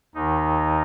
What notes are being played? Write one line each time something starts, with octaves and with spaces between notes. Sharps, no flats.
D#2 D#3 D#4